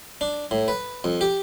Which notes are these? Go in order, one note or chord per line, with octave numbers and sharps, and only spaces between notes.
D4
A2
B4
F2
G4